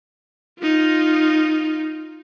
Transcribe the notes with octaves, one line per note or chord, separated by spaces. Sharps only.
D#4 F4